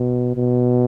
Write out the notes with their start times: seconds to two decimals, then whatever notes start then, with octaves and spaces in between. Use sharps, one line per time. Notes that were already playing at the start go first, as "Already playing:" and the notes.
Already playing: B2
0.36 B2